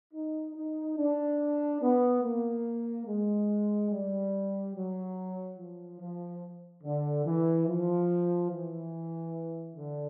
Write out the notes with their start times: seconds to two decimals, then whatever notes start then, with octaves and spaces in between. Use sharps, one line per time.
0.14 D#4
0.55 D#4
0.98 D4
1.82 B3
2.23 A#3
3.06 G#3
3.91 G3
4.75 F#3
5.57 F3
6.00 F3
6.83 D3
7.26 E3
7.68 F3
8.51 E3
9.76 D3